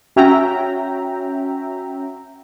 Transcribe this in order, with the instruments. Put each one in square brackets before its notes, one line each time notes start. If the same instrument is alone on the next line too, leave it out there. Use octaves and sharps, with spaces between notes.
[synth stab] C#4 F#4 E5 G5 A#5